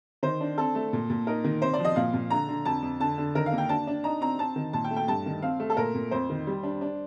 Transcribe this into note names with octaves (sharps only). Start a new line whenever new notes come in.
D#3 C5
D4
C4 A4
A3
A#2
A#2
D#4 A#4
D#3
C3 C5
D5
F3
D#5
A#2 F5
A#2
D3 A#5
D3
F2 A5
F2
D3 A5
D3
D#3 A#4
F5
A#3
G5
D4 A5
D4
D#4 A#5
C4 A#5
C4 A5
D#3
A#2 A5
G5
A3
G5
G2 A5
D#3
C4 F5
A3
A4
A#2 A#4
A#2
F2 C5
D#3
G3
D4
D4